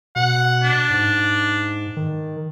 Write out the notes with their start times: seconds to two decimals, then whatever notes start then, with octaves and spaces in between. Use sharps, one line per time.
0.16 B2 F#5
0.63 D4
0.90 G#2
1.97 D#3